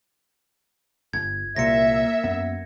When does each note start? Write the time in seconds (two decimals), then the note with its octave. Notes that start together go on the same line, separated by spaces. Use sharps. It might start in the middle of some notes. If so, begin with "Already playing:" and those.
1.13 G1 G#6
1.56 C2 A#2 A#3 E5 A#6 C#7
2.24 F#2 B3